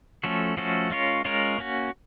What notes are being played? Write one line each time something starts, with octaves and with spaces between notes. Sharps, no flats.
F3 A3 C#4 F#4 A4
F3 A3 C#4 F#4 A4
G#3 C#4 F4 A#4 C#5
G#3 C#4 F4 A#4 C#5
A#3 C#4 F#4